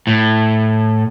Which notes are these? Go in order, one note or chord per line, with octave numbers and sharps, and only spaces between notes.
A2